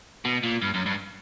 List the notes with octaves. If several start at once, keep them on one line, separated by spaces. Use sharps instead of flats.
B2
A#2
G2
F#2
G2